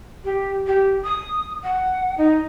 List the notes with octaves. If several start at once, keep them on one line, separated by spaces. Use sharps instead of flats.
G4
G4
D#6
F#5
D#4